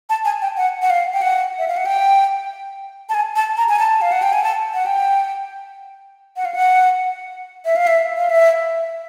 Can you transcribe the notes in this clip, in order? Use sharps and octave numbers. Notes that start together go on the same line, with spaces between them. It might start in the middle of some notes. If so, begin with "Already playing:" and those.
A5
G#5
G5
F#5
F#5
F5
G5
F#5
E5
F5
F#5
G5
A5
G#5
A5
A#5
G#5
A5
F5
F#5
G5
G#5
A5
F#5
G5
F#5
F5
F#5
E5
F5
E5
F5
E5